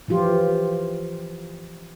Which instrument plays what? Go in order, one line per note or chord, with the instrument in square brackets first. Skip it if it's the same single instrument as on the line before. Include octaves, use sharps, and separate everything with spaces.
[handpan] E3 F3 F4 G4